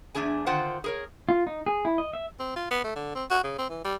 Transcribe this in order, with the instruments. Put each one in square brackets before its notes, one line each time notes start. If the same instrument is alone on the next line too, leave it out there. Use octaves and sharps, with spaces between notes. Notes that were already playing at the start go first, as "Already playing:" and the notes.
[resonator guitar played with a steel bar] E2 C#3 A3 D4 G#4 G#5
D3 D#3 F4 C5 F#5 G5
G#4 A#4 C#5
[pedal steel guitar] F4
D#4
G#4
E4
D#5
E5
[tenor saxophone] C4
F4
B3
A3
D3
C4
F#4
C#3
C4
E3
G3